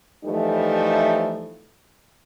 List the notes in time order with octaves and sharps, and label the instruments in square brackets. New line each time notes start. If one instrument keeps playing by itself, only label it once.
[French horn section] E3 F3 G3 A3 D#4